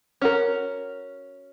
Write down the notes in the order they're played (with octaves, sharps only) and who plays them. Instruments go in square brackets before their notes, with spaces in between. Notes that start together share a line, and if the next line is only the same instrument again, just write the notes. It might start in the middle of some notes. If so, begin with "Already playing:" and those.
[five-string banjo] C#4 F#4 A#4